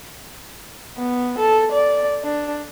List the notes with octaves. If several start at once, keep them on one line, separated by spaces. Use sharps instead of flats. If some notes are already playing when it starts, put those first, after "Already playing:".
B3
A4
D5
D4